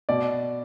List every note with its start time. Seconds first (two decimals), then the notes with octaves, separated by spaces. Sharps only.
0.09 B2 D5